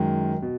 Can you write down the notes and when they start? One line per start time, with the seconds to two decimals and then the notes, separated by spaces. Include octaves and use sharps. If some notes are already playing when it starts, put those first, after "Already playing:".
Already playing: F#2 D#3 G#3
0.42 B2